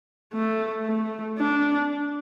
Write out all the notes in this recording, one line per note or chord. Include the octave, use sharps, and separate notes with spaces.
A3
A3
D4